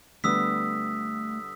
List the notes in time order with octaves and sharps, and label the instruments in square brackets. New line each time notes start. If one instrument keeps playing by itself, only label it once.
[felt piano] D3 G3 B3 [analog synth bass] A3 [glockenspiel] D#6 E6 B6